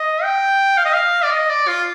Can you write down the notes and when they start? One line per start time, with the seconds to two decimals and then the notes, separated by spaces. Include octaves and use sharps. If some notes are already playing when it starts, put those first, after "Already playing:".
Already playing: D#5
0.23 G5
0.78 F5
0.85 D#5
0.93 F5
1.24 D5
1.31 D#5
1.50 D5
1.68 F4